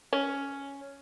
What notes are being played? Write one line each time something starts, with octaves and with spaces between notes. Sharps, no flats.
C#4